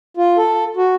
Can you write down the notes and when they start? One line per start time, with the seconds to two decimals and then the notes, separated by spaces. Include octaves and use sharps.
0.17 F4
0.38 A4
0.77 F#4